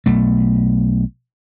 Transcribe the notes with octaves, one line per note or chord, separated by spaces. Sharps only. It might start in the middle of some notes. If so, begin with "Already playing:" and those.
B1 A3